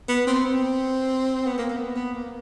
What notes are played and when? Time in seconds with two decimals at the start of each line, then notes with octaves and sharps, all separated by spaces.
0.09 B3
0.27 C4
0.46 C4
1.47 B3
1.58 A#3
1.70 A#3
1.77 B3
1.95 B3
2.14 A#3